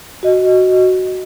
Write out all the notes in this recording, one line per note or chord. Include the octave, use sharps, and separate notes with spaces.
F#4 D#5